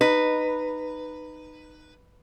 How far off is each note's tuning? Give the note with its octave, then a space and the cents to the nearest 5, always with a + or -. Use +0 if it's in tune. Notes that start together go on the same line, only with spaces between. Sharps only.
D#4 -15 B4 +5